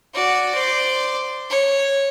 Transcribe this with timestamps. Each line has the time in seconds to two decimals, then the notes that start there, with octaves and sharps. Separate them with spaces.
0.14 F#4 D5
0.54 C5 D5
1.50 C#5